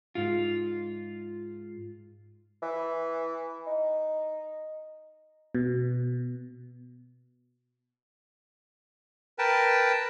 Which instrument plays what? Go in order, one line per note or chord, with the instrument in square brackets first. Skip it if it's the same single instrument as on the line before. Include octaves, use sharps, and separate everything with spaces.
[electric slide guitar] G#2 F4
[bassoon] E3
D#4
[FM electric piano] B2
[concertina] A#4 B4 G5 A5